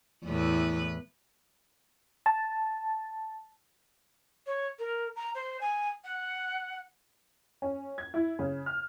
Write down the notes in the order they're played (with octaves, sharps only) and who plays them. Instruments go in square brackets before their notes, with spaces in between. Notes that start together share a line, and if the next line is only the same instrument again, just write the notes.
[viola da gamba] E2 A2 B4
[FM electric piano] A5
[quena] C#5
A#4
A#5
C5
G#5
F#5
[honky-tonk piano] C#4
G#6
E4
C#3
F6